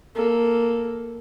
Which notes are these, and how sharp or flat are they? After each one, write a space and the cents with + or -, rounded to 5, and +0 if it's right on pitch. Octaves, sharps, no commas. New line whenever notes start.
A#3 +0 A4 +0